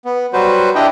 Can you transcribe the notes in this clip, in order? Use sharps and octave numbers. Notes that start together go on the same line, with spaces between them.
B3
F#3 G3 F#4 B4 C5
D4 E4 G4 D#5 G5